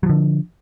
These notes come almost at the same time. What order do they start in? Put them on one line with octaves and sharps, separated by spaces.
F#3 F3 D3